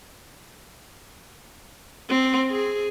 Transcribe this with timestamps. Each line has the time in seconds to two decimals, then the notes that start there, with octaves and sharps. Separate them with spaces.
2.09 C4
2.50 G#4